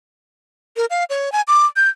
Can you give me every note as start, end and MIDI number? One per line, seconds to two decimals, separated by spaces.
0.77 0.86 70
0.90 1.04 77
1.10 1.32 73
1.32 1.42 80
1.48 1.66 86
1.76 1.89 91